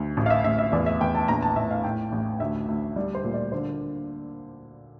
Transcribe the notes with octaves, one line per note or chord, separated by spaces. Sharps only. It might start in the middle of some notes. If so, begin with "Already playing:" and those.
Already playing: D2
A1
F5
E5
A1 E5
E5
E2 D5
E5
E2 G5
A5
A#1 A#5
A5
A2 E5
F5
A2 G5
A1
D2 E5
D2
G3 D5
C5
A#2
D5
D3 C5